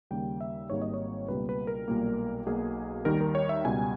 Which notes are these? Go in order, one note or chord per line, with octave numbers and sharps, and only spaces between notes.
D#2 C#3 G3 A#3 G5
E5
G#1 G#2 G3 A#3 C#5
D#5
C#5
C#2 B2 G3 A#3 B4
B4
A#4
B1 A#2 G3 A#3
B1 B2 A#3 G#4
D#2 D#3 G3 A#4
A#4
C#5
E5
C#2 B2 G3 G#5